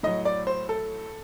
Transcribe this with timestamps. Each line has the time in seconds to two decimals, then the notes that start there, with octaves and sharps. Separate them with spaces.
0.03 A2 F#3 D#5
0.25 D5
0.47 C5
0.69 A4